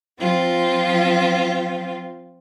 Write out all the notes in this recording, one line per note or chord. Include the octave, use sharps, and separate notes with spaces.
F3 C4 F4